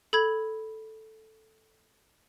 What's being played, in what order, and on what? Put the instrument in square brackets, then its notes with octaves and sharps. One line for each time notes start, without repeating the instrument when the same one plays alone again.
[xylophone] A4 B5 G#6